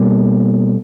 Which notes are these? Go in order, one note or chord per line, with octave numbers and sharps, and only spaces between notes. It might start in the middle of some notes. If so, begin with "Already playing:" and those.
Already playing: B2 G3 A#3